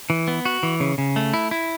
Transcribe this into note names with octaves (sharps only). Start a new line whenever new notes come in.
E3
B3
F#4
E3
C#3
C#3
A3
E4
E4